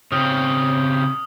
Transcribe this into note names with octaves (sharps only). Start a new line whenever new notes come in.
C#3 C4 D#6 F6